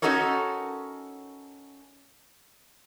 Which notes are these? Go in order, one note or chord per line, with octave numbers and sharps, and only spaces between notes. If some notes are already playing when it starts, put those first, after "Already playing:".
C#4 D#4 F#4 A4 A#4 C#5